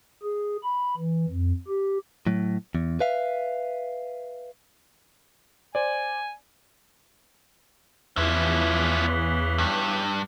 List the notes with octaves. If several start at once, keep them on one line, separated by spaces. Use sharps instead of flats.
G#4
B5
E3
F2
G4
A2 F#3
E2
B4 E5 F5
C5 D5 G#5
E2 C#3 E3 F3 B3 E4
G2